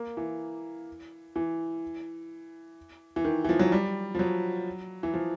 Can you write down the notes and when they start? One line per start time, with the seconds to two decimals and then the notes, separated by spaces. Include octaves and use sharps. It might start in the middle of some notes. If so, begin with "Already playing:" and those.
Already playing: A#3
0.17 E3
1.36 E3
3.16 E3
3.25 D#3
3.45 E3
3.49 F3
3.59 F#3
3.72 G3
4.15 F3
4.19 F#3
5.03 E3
5.14 F3